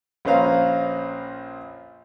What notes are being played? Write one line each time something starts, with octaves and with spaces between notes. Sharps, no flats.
A#1 C#4 B4 C5 F5 A#5